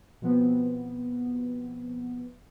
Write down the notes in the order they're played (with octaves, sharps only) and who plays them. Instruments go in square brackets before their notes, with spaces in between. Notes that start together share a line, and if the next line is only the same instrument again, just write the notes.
[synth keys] B2 F3 B3 C4